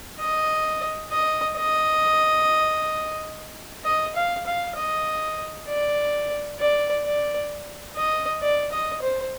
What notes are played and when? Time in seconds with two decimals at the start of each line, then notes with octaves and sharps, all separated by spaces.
0.20 D#5
1.11 D#5
1.57 D#5
3.85 D#5
4.16 F5
4.46 F5
4.76 D#5
5.68 D5
6.60 D5
7.05 D5
7.96 D#5
8.42 D5
8.72 D#5
9.02 C5